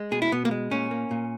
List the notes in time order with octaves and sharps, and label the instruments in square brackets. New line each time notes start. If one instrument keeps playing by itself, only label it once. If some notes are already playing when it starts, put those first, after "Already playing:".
Already playing: [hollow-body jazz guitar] G#3
B2 G#4
E4
B2 B3
A#3
G#3
A#2 C#4
A#3
A#2